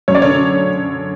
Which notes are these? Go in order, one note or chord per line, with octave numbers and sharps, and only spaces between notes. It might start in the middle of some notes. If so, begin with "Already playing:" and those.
F#2 C#5
D5
D3 C#5